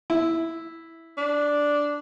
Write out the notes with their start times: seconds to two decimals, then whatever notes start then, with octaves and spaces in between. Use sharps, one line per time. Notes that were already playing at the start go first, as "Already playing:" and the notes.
0.10 E4
1.18 D4